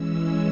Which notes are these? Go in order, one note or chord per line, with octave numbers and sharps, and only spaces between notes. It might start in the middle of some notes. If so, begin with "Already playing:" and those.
Already playing: E3 G#3 C#4 E6